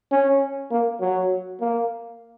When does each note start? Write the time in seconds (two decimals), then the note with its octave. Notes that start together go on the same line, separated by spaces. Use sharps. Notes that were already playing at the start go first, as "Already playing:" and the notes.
0.12 C#4
0.71 A#3
1.01 F#3
1.61 A#3